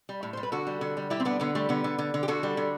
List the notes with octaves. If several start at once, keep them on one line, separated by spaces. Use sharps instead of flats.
G3
A2
G3 C5
B4
D3 F#4 A4
G3
D3
G3
G3 E4 G4
C4
D3 B3 D4
D3 B3
G3 A3
D3 B3
D3
D3
D3
G4
D3 F#4 A4
G3
D3